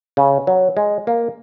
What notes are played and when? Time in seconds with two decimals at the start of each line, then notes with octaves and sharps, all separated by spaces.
0.17 C#3
0.47 F#3
0.77 G#3
1.07 A#3